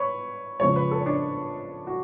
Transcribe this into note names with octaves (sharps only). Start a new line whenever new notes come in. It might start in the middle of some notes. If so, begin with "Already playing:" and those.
Already playing: B4 C#5
F#1 F2 C#3 F3 G#3 C#5
B4
A4
C#4
D4
F#4